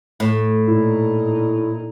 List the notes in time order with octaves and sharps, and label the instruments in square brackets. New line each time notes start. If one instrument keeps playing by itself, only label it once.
[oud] A2
[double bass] A#2 D#4 [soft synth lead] E4